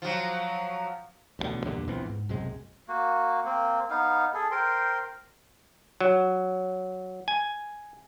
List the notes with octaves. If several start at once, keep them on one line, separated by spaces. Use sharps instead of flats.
F3 F#3
A1 G2 B2 D3
E2 G2 A#2 D3
A#1 E3 B3 C4
G#2
B1 F#2 C3 G#3
A#3 F#4
A#3 C4
B3 D#4 F5
G#4 A4
A#4 C5 G5 C6
F#3
G#5